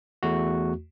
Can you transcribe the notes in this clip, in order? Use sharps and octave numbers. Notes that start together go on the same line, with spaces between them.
E2 A3 F#4